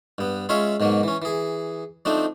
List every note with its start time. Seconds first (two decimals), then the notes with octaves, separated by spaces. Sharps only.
0.18 G2 B3
0.49 G#3 C#4 F4 C#5 E5 F5
0.80 G#2 B2 F#3 A#3
1.03 E3 C#4
1.22 E3 G#4
2.05 F3 A3 C4 D4 D#4